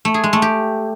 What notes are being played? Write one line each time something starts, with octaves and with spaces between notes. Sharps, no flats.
A3
G#4
G#3
A3
G4